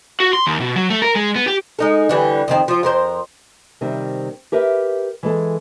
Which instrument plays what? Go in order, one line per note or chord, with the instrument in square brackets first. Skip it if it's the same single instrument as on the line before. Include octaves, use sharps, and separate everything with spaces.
[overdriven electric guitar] F#4
C6
D#2
B2
F#3
A3
A#4
G#3
B3
G4
[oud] G#3 D#4 A4
D3 E3 G3
F2 D#3 C4
F3 F4
F2 A#4 C5
[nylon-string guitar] C3 D#3 G3 C4
G4 A#4 B4 E5
E3 G#3 A4